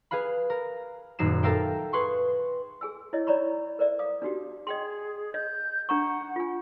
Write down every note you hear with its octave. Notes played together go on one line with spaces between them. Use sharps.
G#4 B4 F5 B5
A#4
D#1 F#2 D#4 C7 E7
A4 A#4 E5 F5 G5
G#4 B4 C6 C#6
G#4 G#5 E6
E4 C#5 D#5
D#4 C#5 D5 A#5 B5 C#6
A#4 C5 D5 E5
F5 D6 D#6
D4 D#4 F#4 G4
G#4 D#5 G5 C6
D#5 G6
D4 F#5 A#5 C#6
F4 G#5